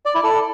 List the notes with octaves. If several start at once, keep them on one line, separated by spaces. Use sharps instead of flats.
D5
E4
A4